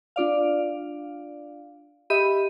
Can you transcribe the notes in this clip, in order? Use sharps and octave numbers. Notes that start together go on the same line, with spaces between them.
D4 F4 D5 F5
G4 D#5 E5 B5 D#7